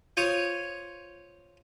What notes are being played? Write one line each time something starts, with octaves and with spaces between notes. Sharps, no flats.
F4 C5 C#5 D#6